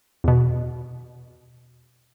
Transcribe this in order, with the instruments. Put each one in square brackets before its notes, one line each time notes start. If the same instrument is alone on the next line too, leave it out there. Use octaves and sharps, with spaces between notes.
[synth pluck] E2 B2